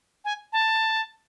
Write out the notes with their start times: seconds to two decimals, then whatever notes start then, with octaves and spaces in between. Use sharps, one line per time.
0.25 G#5
0.53 A5